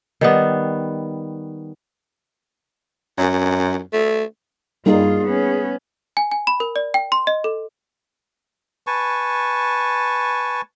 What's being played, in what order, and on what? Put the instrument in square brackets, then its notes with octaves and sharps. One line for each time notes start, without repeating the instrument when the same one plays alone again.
[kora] D#3 G3 B3
[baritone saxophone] F#2
A3
[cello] G2 F4 [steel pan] G3 A#3 D#4 [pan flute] G#4
[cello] B3 C#4
[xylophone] G#5
G#5
B5
A#4
D5
G5
C6
D#5
A4
[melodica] B4 G#5 A5 C#6